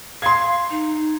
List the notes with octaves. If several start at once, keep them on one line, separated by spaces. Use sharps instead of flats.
F5 C6 G#6
D#4